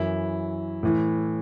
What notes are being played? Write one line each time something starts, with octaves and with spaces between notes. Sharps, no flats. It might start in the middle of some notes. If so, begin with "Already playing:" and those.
Already playing: F#2 E3 E4
A2 E3